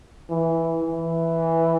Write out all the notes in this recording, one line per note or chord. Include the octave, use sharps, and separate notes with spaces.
E3
E3